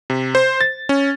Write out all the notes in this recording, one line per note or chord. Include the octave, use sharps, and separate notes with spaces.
C3
C5
A6
C#4